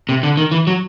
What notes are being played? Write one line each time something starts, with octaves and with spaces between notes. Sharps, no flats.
C3
D3
D#3
E3
F#3